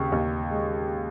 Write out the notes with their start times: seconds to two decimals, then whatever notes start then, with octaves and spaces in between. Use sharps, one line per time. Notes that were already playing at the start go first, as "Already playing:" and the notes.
Already playing: D#2 C#3 C#6
0.12 D#2
0.51 G#3